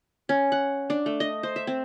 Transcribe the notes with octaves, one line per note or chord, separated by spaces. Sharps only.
C#4
F#5
D4
A3
D#5
C5
E5
C4